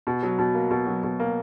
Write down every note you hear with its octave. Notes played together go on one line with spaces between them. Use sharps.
B2
F#3
B2
A#3
B2
F#3
B2
A#3